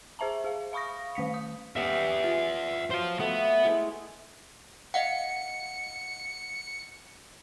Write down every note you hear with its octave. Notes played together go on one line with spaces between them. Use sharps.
G#4 C5 E5 A5 A#5
G#4 F5
F5 B5 C#6 D#6 A#6
D#3 A3 B6 C#7
D#6
G3 B3 C#4 E5 F#5
F4
F#3 C5 F5
A3 B3
G#3 A3 E4
D#5 F5 F#5 C#7